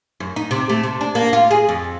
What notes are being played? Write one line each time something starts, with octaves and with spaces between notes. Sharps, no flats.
F#2
D#4
C3
A3
C3
D4
A#3
F4
G#4
F2